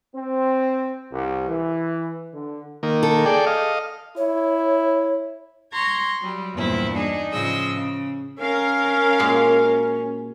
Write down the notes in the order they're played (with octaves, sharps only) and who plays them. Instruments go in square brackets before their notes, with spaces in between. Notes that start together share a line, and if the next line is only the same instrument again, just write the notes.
[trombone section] C4
C2
E3
D3
[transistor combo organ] D#3 A#3
[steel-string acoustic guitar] A4
[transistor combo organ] G#4 D5 G5
D#5 F5
[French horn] E4 [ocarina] C#5
[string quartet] A#5 C6 C#6 G#6
F#3 G3
E2 G2 A#2 C4 E4
D4 D#4 G#4
A2 C#3 F3 G#4 D#5 E6
C#3
[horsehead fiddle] C#4 [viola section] A#4 F5
[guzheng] A#2 G#3 F#4